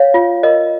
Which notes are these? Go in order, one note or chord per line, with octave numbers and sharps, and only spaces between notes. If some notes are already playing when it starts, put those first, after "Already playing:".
Already playing: C#5 F5
F4
A#4 D#5